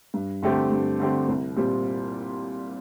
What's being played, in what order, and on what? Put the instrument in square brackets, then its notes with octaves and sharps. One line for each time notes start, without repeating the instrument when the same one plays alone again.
[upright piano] G2
D3 A3 C4 G4
G2
D3 A3 C4 G4
C2
A#2 G3 C4